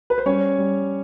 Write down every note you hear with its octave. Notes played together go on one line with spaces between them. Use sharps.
B4
C5
G3 C#4 C#5
G3